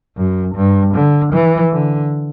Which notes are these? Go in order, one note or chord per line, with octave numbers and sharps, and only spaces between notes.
F#2
G2
D3
E3
D3